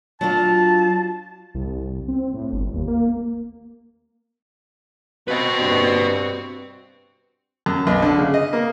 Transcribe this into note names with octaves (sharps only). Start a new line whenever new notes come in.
F#3 D4 F4 A5
C2
C4
A2
G1
D#2
A#3
B2 C4 F#4 B4 D#5
G2
F#2
B1
D3
C#3
D#5
A#3